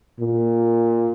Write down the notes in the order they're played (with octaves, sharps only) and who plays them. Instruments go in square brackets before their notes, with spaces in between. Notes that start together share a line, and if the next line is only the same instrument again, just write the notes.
[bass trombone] A#2